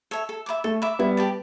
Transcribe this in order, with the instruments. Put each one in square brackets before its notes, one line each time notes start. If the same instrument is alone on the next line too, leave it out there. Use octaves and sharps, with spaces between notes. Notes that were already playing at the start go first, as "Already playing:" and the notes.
[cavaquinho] A4 C#5 E5
A4
E5 B5 D6
[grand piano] A3 [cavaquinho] A4
[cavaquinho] E5 B5 D6
[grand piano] G3 B3 [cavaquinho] E4
[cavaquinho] G4 D5 A5